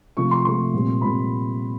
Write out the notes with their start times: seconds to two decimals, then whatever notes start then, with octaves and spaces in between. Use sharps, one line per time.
0.17 C3 F3 A3 C#6
0.31 C6
0.45 C3 F3 A3 C6
0.74 A#2 G3 C4
1.01 A#2 G3 C4 B5